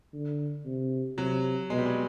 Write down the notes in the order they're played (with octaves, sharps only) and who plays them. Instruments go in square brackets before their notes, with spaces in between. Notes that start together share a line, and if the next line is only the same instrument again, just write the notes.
[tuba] D3
C3
[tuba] C3 [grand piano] F#3
[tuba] B2 [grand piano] G#3
[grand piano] G3
G#3